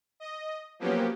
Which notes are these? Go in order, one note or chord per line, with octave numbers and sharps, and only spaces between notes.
D#5
F3 F#3 A#3 B3 C#4 G4